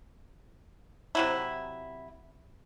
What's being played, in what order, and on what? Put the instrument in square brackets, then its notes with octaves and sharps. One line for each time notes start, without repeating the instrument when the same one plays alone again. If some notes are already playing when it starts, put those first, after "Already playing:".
[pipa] C3 F#3 E4